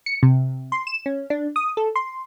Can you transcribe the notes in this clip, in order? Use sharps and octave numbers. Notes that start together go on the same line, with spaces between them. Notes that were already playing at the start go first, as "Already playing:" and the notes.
C#7
C3
C6
E7
C#4
D4
D#6
A4
C6